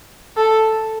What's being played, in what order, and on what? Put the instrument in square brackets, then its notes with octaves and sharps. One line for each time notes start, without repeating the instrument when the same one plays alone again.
[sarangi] A4